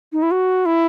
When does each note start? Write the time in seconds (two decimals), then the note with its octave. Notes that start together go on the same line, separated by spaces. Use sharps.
0.12 D#4
0.22 E4
0.31 F#4
0.66 E4